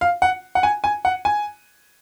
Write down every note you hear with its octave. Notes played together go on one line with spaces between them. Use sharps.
F5
F#5
F#5
G#5
G#5
F#5
G#5